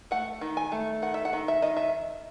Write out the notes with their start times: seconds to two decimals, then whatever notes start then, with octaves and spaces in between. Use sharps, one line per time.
0.11 A3 F#5
0.41 D#3
0.57 G#5
0.72 A3
1.02 D#3 F#5
1.14 E5
1.25 F#5
1.33 D#3
1.48 E5
1.62 D#3 D#5
1.77 E5